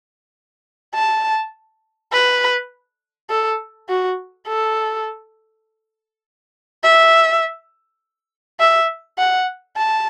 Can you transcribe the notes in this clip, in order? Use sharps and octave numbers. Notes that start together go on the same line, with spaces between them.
A5
B4
A4
F#4
A4
E5
E5
F#5
A5